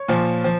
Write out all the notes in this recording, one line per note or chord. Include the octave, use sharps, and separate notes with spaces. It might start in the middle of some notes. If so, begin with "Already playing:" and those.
Already playing: C#5
A#2 F3
F3